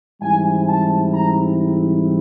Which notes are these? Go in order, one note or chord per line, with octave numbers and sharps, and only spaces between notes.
G#2 E3 G3 C4 E4 G#5
A5
A#5